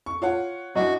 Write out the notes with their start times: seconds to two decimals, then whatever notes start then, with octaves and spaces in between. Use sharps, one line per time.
0.06 C#6
0.22 F4 C#5 F#5
0.76 F#2 D4 E4 F#4 D#5